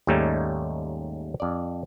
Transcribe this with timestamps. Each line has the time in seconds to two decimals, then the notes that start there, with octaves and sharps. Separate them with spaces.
0.07 D#2 G#2 G3 A3 C#4 D#4
1.40 F2 D5